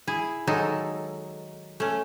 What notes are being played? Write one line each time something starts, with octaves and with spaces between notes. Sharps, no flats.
E4 G#4
D#3 F#3 G#3 D#4 A4
A3 C#4